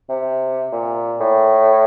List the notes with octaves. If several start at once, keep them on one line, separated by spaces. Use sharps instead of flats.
C3
A#2
A2